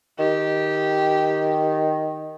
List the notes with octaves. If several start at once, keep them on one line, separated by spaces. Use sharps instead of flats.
D#3 G4